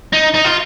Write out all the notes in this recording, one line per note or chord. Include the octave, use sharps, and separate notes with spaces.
D#4
D#4
F4